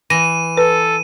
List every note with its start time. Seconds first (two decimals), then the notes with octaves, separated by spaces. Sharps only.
0.10 E3 A#6 D#7
0.57 A4 B4